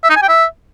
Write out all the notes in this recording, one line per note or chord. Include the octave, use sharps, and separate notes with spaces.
E5
D#4
G#5
G5
E5